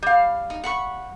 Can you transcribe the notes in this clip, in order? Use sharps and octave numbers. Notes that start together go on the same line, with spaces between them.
G3 F5
D#4
F#5 B5 C#6